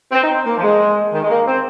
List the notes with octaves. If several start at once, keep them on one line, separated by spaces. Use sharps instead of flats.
C4
D#4
C4
A#3
F3
G#3
D#3
G#3
A#3
C4